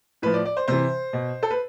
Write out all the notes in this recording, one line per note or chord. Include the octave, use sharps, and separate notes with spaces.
A2 F3 B4
D5
D5
C5
C3 E3 C5
B2
A4
B4